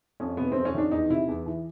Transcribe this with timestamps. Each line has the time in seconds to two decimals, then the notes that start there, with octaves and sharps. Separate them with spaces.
0.20 F2 C#4
0.37 C3 B3
0.52 F2 C4
0.65 C#4
0.74 D#3 D4
0.91 E2 D#4
1.09 C3 E4
1.28 E2
1.46 E3